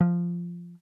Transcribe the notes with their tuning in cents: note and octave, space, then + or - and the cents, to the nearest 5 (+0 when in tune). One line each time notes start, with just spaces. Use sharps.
F3 -5